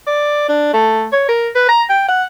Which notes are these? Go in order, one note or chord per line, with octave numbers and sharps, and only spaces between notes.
D5
D4
A3
C#5
A#4
B4
A#5
G5
F#5